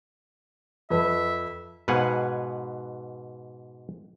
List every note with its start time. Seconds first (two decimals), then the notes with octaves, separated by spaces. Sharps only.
0.90 F2 B4 E5
1.88 G#2 B2 B4 F5 F#5 G#5